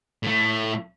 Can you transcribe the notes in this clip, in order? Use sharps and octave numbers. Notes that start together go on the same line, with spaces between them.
A2 A3